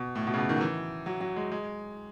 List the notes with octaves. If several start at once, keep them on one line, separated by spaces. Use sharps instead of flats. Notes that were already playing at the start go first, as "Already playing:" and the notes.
Already playing: B2
A2
B2
C#3
B2
D#3
F#3
E3
F#3
F#3
G#3
G#3